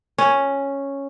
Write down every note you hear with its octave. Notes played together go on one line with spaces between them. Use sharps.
C#4